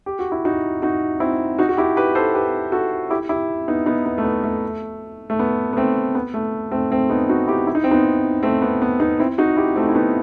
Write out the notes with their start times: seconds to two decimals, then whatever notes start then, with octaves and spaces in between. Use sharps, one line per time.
0.06 G4
0.19 F#4
0.32 E4
0.45 D#4 F#4
0.82 D#4 F#4
1.20 C4 E4
1.59 D#4 F#4
1.69 F#4
1.77 E4 G4
1.96 G4 B4
2.15 A4 C5
2.34 G4 B4
2.72 F#4 A4
3.10 E4 G4
3.29 E4 G4
3.68 B3 D#4
3.86 B3 D#4
4.06 B3
4.18 A3
4.24 B3
4.44 A3
5.30 A3
5.39 B3
5.73 B3
5.77 A3 C4
6.15 B3
6.34 A3
6.71 A3 C4
6.91 A3 C4
7.10 B3 D#4
7.29 D#4 F#4
7.48 E4 G4
7.67 E4
7.75 D#4
7.84 C4
7.91 B3 D#4
8.43 A3 C4
8.62 B3
8.82 B3
9.00 B3 D#4
9.20 C4 E4
9.38 D#4 F#4
9.57 E4 G4
9.76 A3 C4
9.89 E4
9.95 B3 D#4